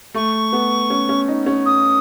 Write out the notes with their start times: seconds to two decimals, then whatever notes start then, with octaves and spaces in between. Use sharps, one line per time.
0.14 A3 C#6
0.53 B3
0.90 C#4
1.09 C#4
1.28 D#4
1.46 C#4
1.65 D#6